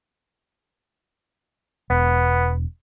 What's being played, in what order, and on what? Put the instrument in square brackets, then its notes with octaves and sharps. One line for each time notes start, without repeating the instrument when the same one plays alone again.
[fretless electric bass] E1 [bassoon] B3